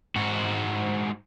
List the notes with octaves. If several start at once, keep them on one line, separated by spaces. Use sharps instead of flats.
G#2 F#4